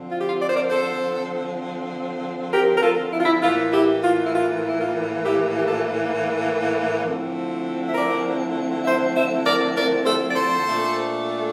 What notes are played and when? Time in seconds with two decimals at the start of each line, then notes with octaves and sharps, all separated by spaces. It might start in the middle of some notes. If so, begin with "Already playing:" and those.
Already playing: D3 F3 C4
0.10 F4
0.19 G4
0.28 F4
0.41 D5
0.48 C5
0.55 A#4 D5
0.70 A4 C5
2.52 G4 A#4
2.75 A#4
2.81 F4 A4
3.12 E4
3.19 F4
3.25 E4
3.42 A2 E3 A#3 E4 F4
3.72 E4 G4
4.02 F4
4.26 E4
4.33 F4
4.68 E4
4.78 F4
5.23 E4 G4
5.57 G4
5.68 F4 A4
7.04 D3 F3 A3 C4 E4
7.87 E5
7.95 A#4 D5
8.85 C5 E5
9.15 C5 E5
9.45 A#4 D5
9.75 A#4 D5
10.05 A4 C5
10.29 D5
10.36 A4 C5
10.66 A#2 A3 D4